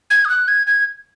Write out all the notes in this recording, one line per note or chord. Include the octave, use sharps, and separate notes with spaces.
G#6
D#6
F#6
G#6
G#6